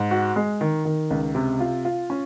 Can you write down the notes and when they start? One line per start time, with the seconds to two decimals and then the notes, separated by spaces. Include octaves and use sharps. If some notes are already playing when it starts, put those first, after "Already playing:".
Already playing: G#2
0.11 F#4
0.36 G#3
0.61 D#3
0.85 D#3
1.10 C#2
1.35 C3
1.60 F4
1.85 F4
2.10 C#4